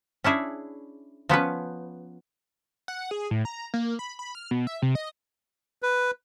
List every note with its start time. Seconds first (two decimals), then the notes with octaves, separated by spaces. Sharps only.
0.24 C#4 D4 E4 G#4
1.29 F3 B3 C#4 B4
2.88 F#5
3.11 G#4
3.31 A2
3.45 A#5
3.74 A#3
3.99 B5
4.19 B5
4.35 F6
4.51 B2
4.67 E5
4.82 C3
4.95 D#5
5.82 B4